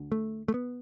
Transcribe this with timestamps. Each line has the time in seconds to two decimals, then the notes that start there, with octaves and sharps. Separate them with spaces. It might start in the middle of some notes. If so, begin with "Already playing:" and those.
Already playing: D2 D3
0.12 A3
0.48 A3
0.54 B3